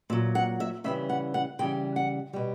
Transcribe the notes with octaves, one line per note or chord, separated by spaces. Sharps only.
A#2 F#3 E5
F#5
E5
C#3 E3 G3 E5
F#5
F#5
C#3 E3 G3 G5
F#5
B2 G3